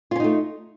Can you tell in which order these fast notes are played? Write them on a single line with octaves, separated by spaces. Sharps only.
F4 C#4 D#4 A3